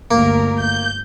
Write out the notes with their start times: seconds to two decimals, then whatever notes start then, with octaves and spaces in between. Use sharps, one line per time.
0.11 G1 D2 A#3 A#4
0.61 G6